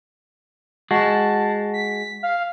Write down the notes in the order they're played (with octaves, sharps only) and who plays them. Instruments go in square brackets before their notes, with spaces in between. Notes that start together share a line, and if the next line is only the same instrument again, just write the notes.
[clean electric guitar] G#3 F#4 [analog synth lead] A5
[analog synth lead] B6
F5